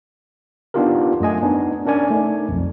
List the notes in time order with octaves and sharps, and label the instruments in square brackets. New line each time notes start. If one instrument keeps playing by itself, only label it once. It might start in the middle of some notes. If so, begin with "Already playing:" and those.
[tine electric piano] B3 D4 D#4 F4 G4 A#4
F#2 A3 D#5 G#5
B3 D4 D#4
C#4 D4 A#4 D5 G#5
A3 D#4
B1 F2